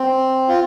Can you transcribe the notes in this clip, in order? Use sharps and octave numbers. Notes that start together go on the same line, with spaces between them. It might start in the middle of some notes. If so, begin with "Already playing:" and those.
Already playing: C4
F4